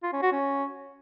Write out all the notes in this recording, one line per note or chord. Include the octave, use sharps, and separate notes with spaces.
F4
C#4
F#4
C#4